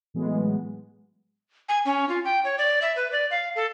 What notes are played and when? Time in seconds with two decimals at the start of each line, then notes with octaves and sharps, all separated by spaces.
0.14 A2 E3 F#3 G#3 B3
1.69 G#5
1.85 C#4
2.09 F4
2.25 G5
2.44 C#5
2.58 D5
2.82 E5
2.96 B4
3.12 D5
3.31 F5
3.56 A4